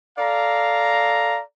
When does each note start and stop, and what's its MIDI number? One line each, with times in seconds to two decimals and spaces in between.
0.19 1.39 69
0.19 1.39 74
0.19 1.39 77
0.19 1.39 82